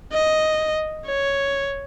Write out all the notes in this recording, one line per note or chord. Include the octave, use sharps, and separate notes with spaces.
D#5
C#5